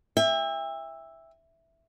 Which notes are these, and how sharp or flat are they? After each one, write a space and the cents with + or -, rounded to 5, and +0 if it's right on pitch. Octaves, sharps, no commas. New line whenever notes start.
E5 +0 G5 +40